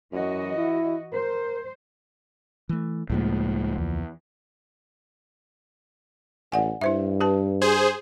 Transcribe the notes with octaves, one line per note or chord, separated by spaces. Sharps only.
F#2 E3 F#4 D#5
E4
A#4 C5
E3 A3
C#2 A2 F3 G#3 A#3
E2
A1 D5 F#5 G#5
G2 E4 C5 E5
G4 B4 A5
G#4 C5